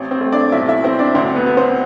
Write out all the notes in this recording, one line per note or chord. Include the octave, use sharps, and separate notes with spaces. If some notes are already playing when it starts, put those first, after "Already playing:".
Already playing: A1 C4
C4 C5
A3
D4 D5
B1 E4 E5
E4 E5
C4 C5
D4 D5
D2 C4 C5
B3 B4
B3
C4 C5